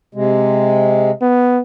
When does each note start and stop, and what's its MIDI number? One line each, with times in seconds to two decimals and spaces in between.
0.15 1.11 48
0.15 1.11 56
1.22 1.60 59